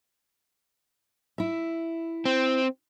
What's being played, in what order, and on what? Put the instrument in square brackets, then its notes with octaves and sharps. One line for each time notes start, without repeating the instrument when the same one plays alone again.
[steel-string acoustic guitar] E4 E5
[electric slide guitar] C4